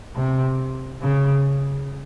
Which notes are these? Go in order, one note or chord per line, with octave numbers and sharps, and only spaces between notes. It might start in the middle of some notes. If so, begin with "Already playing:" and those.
C3
C#3